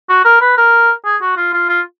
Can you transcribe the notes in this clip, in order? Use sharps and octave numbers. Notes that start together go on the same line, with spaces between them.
F#4
A#4
B4
A#4
G#4
F#4
F4
F4
F4